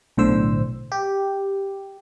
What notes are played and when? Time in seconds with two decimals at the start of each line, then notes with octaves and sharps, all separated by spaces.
0.17 B1 A2 D3 C5 E6
0.92 G4